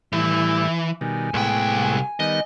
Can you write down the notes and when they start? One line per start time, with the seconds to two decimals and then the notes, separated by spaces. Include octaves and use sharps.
0.13 A2 E3 G3 E4
1.01 B2 D#3 G3 G#5
1.34 C2 A2 G#3 B3 G5
2.20 D#3 G3 B3 D#5